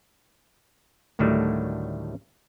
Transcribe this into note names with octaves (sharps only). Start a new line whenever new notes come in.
D2 A2 D#3 F#3 G3 A3